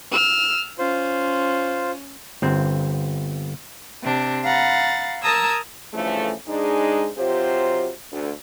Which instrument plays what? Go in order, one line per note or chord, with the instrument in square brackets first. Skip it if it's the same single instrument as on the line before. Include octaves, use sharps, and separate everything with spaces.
[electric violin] E6 F6
[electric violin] C#4 [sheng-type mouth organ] F4 C5
[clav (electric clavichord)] G1 C4
[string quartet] C3 D4
F5 F#5 A#5 B5 A6
A#4 A5 A#5 D#6 E6 G#6
[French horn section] G2 C#3 E3 F3 A3
G#2 G#3 D4 D#4 G#4
C3 F#3 F4 G4 C5
D2